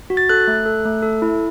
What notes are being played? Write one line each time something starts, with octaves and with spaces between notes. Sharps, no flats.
F#4
A6
A4 F#6
A3
A4
A3
A4
E4